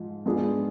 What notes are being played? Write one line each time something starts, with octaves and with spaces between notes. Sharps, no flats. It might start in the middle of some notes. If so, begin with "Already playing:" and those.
Already playing: G#2 F3
G#2 F3 B3 D4 G#4